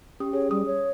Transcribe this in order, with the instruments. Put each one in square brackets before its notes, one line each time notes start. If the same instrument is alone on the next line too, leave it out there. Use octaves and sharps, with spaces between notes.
[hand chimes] C#4 G4 D#6
[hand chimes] G#4 [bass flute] C#5
[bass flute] G3 [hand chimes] D#6
[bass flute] C#5